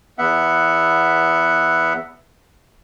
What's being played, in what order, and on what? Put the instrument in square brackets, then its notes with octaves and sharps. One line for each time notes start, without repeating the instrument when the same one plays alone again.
[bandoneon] E2 B3 E5 F#5